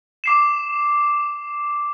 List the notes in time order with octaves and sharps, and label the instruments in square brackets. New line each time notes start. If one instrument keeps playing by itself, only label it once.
[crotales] D6 C7 E7